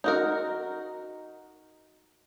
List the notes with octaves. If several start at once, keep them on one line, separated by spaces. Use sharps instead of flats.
D#4 F#4 A#4